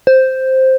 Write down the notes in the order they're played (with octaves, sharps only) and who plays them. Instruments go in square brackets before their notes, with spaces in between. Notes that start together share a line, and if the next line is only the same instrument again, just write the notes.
[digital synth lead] C5